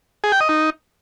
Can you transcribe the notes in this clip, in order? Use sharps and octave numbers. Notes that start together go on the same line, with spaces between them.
G#4
G5
D#5
D#4